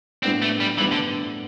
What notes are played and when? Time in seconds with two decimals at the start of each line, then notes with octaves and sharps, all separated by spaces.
0.23 A2 G3 B3 C4 D4
0.42 A3
0.60 G3
0.78 A2 E3 G3 B3 D4
0.92 D3